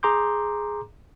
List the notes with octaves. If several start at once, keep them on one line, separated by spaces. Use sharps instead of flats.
G#4 A#5 C6 D6 G6